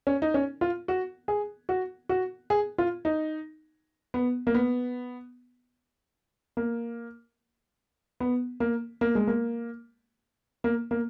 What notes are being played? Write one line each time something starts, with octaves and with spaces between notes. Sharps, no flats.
C#4
D#4
C#4
F4
F#4
G#4
F#4
F#4
G#4
F4
D#4
B3
A#3
B3
A#3
B3
A#3
A#3
G#3
A#3
A#3
A#3